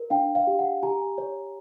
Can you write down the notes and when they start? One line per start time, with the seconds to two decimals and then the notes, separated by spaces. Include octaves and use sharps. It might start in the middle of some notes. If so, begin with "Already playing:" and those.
Already playing: A#4
0.10 D4 F5 G5
0.35 F5
0.47 G4
0.59 F#5
0.83 G4 G#5 A#5
1.18 C#5